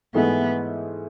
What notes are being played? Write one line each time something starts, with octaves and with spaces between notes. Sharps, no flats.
G#2 E3 A3 B3 E4 G#4